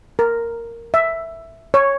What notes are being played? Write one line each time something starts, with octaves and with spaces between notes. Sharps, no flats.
A#4
E5
C#5